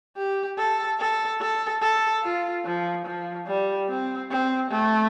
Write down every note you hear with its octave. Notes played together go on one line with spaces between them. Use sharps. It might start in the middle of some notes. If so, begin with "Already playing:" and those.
G4
A4
A4
A4
A4
F4
F3
F3
G3
C4
C4
A3